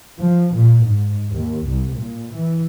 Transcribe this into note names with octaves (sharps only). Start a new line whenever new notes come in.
F3
A#2
G#2
D#2
C2
A#2
E3